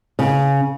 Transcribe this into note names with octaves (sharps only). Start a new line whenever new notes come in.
C#3